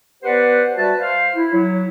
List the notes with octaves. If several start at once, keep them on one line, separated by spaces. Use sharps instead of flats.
B3 G4 B4 C5 D5 F#5
G3 F#4 B4 E5 A5
C5 F5
E4
F#3 E4 C#5